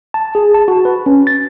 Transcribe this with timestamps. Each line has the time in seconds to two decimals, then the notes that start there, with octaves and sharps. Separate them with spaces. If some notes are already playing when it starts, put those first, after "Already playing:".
0.14 A5
0.35 G#4
0.54 A5
0.68 F#4
0.85 B4
1.06 C#4
1.27 A6